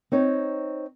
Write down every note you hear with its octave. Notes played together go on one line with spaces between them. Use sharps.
C4 D#4 C#5